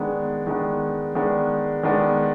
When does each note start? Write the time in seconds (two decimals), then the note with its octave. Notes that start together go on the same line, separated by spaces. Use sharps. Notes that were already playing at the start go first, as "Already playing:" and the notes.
Already playing: D#3 G#3 B3 D4
0.47 D#3 G#3 B3 D4
1.15 D#3 G#3 B3 D4
1.83 D#3 G#3 B3 D4